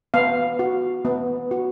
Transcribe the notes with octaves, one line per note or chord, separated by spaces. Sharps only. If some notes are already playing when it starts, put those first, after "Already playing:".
B3 F5
F#4
B3
F#4